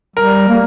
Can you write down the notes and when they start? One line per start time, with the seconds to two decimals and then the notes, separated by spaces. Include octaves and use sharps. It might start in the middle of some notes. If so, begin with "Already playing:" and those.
0.16 G3 A#4
0.48 A#3